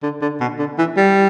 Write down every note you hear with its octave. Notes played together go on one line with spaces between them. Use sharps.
D3
D3
B2
D3
E3
G3